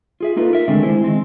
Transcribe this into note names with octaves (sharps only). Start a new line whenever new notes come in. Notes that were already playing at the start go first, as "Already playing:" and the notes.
F4 G#4 E5
A#3 D#4 F4 A4 B4
A#4 E5
D3 D#3 G#3 A3 C4 D4
G#3 E4 C5
D#3 E3 G#3 C4